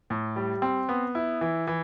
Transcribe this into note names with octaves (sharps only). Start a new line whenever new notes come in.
A2
G3
C4
B3
E4
E3
E3